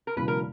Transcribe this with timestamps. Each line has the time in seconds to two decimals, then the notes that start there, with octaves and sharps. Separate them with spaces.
0.07 A#4
0.16 E1 E2 C#3 F#3 B4
0.28 A#4